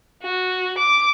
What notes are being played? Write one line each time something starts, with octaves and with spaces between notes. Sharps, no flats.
F#4
D6